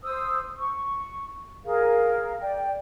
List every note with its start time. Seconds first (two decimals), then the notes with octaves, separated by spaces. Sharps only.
0.04 C5 D#6 E6
0.58 C#6
1.65 G#4 A#4 F5
2.41 D5 G5